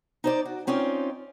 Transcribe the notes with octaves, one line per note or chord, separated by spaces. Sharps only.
D#4 C5 D5
F#4
C4 C#4 D#4 F4 D5